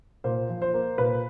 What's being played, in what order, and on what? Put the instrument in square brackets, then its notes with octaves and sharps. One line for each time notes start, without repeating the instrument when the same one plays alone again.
[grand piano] A#2 C5
F3
C5
A#3
A#2 B4